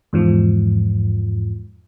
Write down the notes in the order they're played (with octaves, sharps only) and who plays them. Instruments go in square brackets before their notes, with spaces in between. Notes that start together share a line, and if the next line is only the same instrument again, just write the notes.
[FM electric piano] E2 G#2 F3